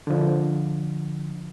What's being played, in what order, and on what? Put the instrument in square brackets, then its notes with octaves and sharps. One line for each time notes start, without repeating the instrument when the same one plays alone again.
[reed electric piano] D3 F3